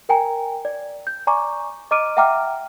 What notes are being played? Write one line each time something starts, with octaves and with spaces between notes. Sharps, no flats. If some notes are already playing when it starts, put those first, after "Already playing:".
A#4 G5 G#5 A#5
D5
G6
D5 G#5 A#5 C#6 D6
D#5 A#5 D6 F6 D7 D#7
E5 F#5 G5 A#5 D6 F6